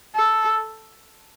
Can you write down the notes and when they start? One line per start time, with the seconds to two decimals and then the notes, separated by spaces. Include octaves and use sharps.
0.15 A4